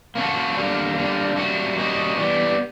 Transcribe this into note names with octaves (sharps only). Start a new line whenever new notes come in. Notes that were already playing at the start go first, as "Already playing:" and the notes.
A#3 C#4 F#4 A4 F5
D3 G3 A#3 F5
D3 G3 A#3
G3 A#3 C#4 F#4 E5
G3 A#3 C#4 F#4 D#5
E3 G3 B3 D5